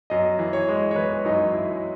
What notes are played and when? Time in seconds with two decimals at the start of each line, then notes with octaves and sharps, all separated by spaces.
0.10 F#2 D#5
0.39 E3
0.53 C#5
0.68 G#3
0.91 C#5
0.96 E3 B4
1.25 F#2 D#4
1.53 F#2 E4